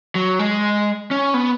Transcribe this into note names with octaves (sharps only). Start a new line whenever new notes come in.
F#3
G#3
C#4
B3